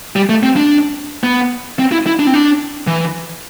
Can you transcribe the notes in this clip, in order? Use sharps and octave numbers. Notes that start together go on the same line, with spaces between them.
G3
A3
C4
D4
B3
C4
E4
E4
D4
C4
D4
E3